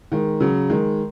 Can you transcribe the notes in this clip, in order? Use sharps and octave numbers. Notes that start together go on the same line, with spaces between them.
D#3 G#3
C#3 F#3
D#3 G#3